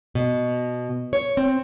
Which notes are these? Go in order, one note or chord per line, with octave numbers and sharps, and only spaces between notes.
B2
C#5
C4